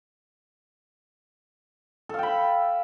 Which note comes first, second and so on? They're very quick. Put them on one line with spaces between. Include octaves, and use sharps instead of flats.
A4 F5 G5 B5